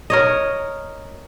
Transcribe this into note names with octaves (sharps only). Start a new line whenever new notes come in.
A#4 C#5 D#5